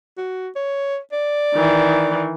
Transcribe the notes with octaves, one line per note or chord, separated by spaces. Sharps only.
F#4
C#5
D5
D#3 E3